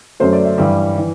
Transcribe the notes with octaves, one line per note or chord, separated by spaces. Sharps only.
F#2 F#3 A3 C5
D5
E5
G2 E3 G3
E3